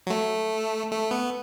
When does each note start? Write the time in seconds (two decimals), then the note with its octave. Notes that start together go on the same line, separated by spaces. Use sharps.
0.07 F#3
0.10 A3
0.92 A3
1.11 B3